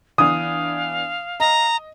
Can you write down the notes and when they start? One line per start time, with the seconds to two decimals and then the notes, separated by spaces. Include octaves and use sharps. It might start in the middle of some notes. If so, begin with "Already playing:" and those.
0.18 E3 B3 D4 F5 D#6
1.40 D#5 A#5